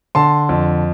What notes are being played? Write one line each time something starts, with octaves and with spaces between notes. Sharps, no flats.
D3 A5 C6
F2